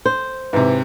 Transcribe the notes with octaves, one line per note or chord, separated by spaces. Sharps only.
C5
G#2 C3 E3